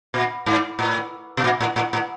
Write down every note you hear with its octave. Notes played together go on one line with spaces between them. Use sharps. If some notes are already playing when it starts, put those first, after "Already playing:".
A#2
G#2
A2
B2
A#2
A2
A2
A2